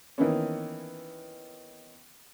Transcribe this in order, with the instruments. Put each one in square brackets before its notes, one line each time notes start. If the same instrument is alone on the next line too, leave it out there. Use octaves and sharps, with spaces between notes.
[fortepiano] D#3 E3 A#3 B3 C#4